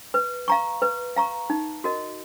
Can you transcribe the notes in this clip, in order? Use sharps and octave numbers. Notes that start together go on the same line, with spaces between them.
B4
F5 A#5 C#6
B4
F5 A#5 C#6
D#4
F#4 A#4 D#5